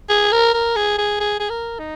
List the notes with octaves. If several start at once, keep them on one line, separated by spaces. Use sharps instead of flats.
G#4
A#4
A#4
G#4
G#4
G#4
G#4
A#4
D#4